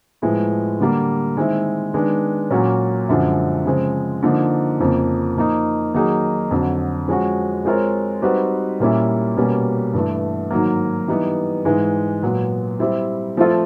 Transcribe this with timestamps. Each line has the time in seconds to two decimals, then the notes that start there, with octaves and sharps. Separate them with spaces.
0.22 A2 F3 G#3 B3
0.80 D3 G3 A#3
1.37 D#3 G#3 C4 E4
1.94 D#3 G#3 B3 D4
2.51 A#2 F#3 A#3 C#4 F#4
3.09 F#2 D3 F3 G#3
3.65 C#3 F3 G#3 C4
4.23 D3 F3 A#3 D#4
4.80 F2 C#3 F3 A#3
5.37 F3 A#3 D#4
5.94 D#3 F#3 A#3 D#4 G#4
6.51 F2 D3 F#3
7.08 F3 G#3 C#4 F#4
7.65 G#3 C4 F4 A#4 C#5
8.22 G3 C4 D#4 F#4 B4
8.80 A#2 G3 A#3 C#4 E4
9.37 B2 G3 A#3 C#4
9.93 G2 E3 A3
10.51 G#2 D#3 F#3 A#3
11.08 E3 G3 B3 D#4
11.65 G#2 E3 G#3
12.22 A#2 F#3 B3
12.80 G3 C4 E4
13.37 F3 A3 C4 F4 A4